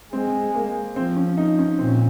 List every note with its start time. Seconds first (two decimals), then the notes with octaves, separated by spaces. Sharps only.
0.13 G#3 C4
0.55 A#3
0.96 F3 C4
1.16 C#4
1.37 D#4
1.58 C#4
1.79 A#2 C4
1.88 C#4